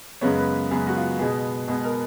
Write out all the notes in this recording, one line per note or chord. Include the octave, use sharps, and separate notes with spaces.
F#2 C#3 G#3 B3 C#5
B4
F#2 C#3 G#3 B3 G#4
F#4
F4
B2 G#3 B3 G#4
B2 G#3 B3 G#4
A#4